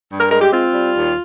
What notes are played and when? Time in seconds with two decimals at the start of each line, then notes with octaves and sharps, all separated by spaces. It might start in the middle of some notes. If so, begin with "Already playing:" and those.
0.10 G2
0.20 A#4
0.31 G#3 A#4
0.42 G4
0.52 C4 F4
0.73 G3
0.95 D#2